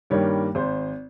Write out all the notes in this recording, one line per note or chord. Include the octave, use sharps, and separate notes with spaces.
G2 D#3 G3 A#3 C#5
G#1 C5